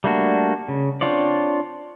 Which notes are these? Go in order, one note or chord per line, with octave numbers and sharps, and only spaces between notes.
G3 A3 A#3 D4 F#4
C#3
C4 D4 F4 C#5 D5